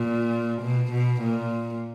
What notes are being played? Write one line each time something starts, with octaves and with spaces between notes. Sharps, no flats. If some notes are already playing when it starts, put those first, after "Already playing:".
Already playing: A#2
B2
B2
A#2